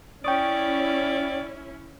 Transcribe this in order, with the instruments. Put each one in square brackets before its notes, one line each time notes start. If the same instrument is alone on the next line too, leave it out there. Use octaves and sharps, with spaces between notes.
[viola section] C#4 E4 [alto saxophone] D5 [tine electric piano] G5 C#6 D#6